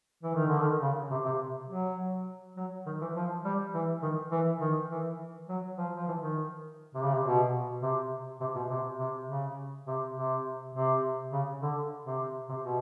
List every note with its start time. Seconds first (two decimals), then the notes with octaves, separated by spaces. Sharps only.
0.23 E3
0.35 D#3
0.47 D3
0.60 D#3
0.82 C#3
1.11 C3
1.25 C3
1.69 F#3
2.57 F#3
2.86 D#3
3.01 E3
3.15 F3
3.45 G3
3.74 E3
4.02 D#3
4.31 E3
4.61 D#3
4.91 E3
5.49 F#3
5.77 F3
5.96 F3
6.07 E3
6.21 D#3
6.94 C3
7.04 C#3
7.13 C3
7.24 B2
7.82 C3
8.41 C3
8.55 B2
8.70 C3
8.99 C3
9.28 C#3
9.87 C3
10.16 C3
10.75 C3
11.32 C#3
11.62 D3
12.05 C3
12.49 C3
12.64 B2